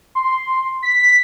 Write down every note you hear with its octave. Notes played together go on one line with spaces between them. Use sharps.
C6
B6